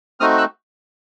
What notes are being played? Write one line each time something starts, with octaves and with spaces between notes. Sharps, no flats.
A3 C4 D#4 F#4 D#6 F6
E6 F#6